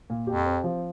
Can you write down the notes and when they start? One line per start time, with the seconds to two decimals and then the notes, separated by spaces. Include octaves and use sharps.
0.10 A#2
0.27 F2 G4
0.46 C4
0.64 F3